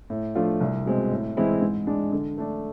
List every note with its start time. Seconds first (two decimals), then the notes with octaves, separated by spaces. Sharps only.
0.10 A2
0.35 F3 A3 D4 F4
0.60 C2
0.86 B2 G#3 C4
1.11 A2
1.37 E3 G#3 C4 E4
1.62 G#2
1.87 G#3 D4
2.12 D3
2.38 A3 D4